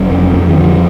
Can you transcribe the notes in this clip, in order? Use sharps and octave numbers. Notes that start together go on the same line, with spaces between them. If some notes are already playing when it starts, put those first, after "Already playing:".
Already playing: F1 F#3
F2
F2
E3
D3 F3